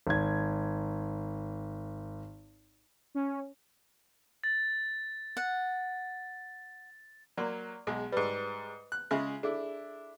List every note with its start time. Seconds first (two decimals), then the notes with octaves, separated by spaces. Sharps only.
0.07 G#1 G#6
3.15 C#4
4.44 A6
5.37 F#5
7.37 F#3 A#3 D5 C6
7.87 B1 G#3 G#4
8.12 G#2 G3 B4
8.92 F#6
9.11 C#3 G#3 F4 E5 D6
9.43 D4 E4 G#4 A4